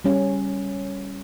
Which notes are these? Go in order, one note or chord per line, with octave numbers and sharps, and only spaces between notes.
G3 C#4